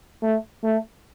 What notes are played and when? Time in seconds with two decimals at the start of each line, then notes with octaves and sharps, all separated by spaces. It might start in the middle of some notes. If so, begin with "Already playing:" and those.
0.23 A3
0.64 A3